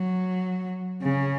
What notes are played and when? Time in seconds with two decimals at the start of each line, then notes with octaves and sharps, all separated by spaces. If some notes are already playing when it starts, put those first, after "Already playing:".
Already playing: F#3
1.02 C#3